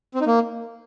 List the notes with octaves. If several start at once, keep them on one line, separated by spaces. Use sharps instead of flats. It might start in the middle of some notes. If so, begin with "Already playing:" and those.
C4
D#4
A#3